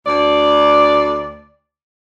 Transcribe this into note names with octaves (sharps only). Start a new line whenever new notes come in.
D2 D5